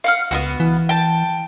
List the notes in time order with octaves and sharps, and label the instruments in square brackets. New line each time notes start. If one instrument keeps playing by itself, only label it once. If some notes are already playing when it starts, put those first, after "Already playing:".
[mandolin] F5 F#5 F6
[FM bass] C#2 [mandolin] B3 C4 F#4
[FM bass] E3
[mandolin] G5 A5